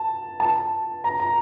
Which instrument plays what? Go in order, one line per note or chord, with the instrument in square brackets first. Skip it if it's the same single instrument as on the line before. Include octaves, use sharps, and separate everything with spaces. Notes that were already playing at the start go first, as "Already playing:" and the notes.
Already playing: [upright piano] A5
A5
A#5
A#5